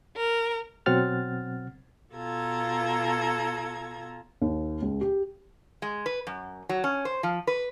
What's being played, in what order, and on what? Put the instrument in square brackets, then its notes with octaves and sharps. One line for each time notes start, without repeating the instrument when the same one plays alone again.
[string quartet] A#4
[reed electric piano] B2 F#3 C4 F#5 F6 A6
[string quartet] B2 F4 A4 A#5 G#6
[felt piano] D#2
C#2
G4
[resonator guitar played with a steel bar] G#3
B4
F#2
F#3
C#4
C5
F3
B4